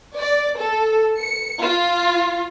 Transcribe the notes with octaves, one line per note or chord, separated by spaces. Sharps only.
D5
A4
C#7
F4